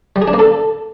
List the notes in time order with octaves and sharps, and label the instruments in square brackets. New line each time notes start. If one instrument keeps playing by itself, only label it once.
[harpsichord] G3
G#4
D4
A#3
A4